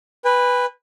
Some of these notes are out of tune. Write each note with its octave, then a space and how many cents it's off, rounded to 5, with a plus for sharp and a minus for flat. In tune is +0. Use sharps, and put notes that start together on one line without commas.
B4 +0 G#5 -45